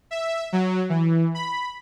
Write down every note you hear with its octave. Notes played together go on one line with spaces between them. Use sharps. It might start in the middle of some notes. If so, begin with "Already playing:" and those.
E5
F#3
E3
B5